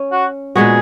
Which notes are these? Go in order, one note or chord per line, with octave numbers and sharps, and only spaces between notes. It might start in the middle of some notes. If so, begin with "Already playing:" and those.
Already playing: C#4
F#4
A#2 G#3 B3 F#4 G#4